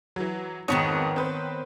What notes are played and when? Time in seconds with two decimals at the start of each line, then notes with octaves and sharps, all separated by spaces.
0.16 E3 F#3
0.68 F2 G#2 D#3 B3 C#5 D#6
1.16 C4 B4 C5